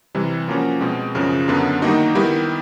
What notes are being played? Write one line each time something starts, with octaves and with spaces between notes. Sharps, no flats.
C3 E3 G3
F3 A#3 C#4 F#4
B2 G#3 C4
F#2 C#3 F3
F#2 D3 F#3 B3 D4
D#3 G3 A#3 D#4 F#4
D#3 G3 B3 E4 G4